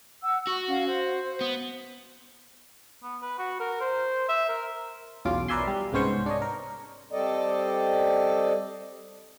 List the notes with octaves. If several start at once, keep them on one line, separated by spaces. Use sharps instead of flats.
F#5 E6
F#4 C#6
C#4 F5 F#5
C5
B3
B3
B4
F#4
A#4
C5
E5
A#4
B1 E2 C#4 F4 D6
A#4 B4 D5 E5 G#5 C6
G3
C2 G#2 B3 C#4 C5 C#6
D4 C#5 D#5
A#4
G3 C4 A4 D5 D#5